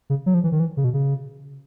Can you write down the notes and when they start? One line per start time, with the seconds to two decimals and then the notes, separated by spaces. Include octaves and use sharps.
0.10 C#3
0.26 F#3
0.34 F3
0.44 E3
0.52 D#3
0.60 E3
0.77 C#3
0.84 B2
0.94 C#3